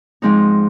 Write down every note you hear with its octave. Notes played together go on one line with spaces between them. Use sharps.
G#2 F3 G#3 C4 D#4